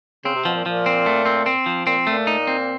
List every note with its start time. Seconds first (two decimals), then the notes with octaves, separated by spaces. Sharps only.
0.24 C#3 C4
0.35 C3
0.45 B2 F3
0.55 A#2
0.66 A#2 F3
0.86 C4
1.06 A3
1.26 C4
1.46 C4
1.66 F3
1.86 A#2 C4
2.03 A#2 A3
2.27 D#4
2.47 C4